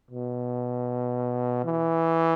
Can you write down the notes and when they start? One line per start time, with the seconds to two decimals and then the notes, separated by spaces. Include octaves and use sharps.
0.11 B2
1.64 E3